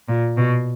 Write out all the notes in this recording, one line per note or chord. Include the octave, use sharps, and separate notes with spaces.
A#2
B2